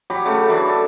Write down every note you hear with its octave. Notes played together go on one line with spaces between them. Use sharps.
F#3 G4 B5
C#3 A3
E3 F#3 D4
A4